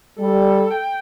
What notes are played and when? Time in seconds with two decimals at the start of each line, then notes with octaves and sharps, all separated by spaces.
0.19 G3 A4
0.71 G5